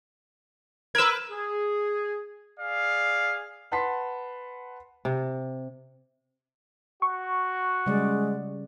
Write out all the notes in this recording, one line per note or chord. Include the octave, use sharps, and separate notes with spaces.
A#4 B4 E6 G#6
G#4
G#4 D5 F5
B4 F#5 A5 C6 B6
C3
F#4 C#6
C#3 G3 G#3 D5